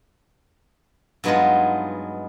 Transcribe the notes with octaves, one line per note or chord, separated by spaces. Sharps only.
G2 F#3 G#3 B3 D#4 F4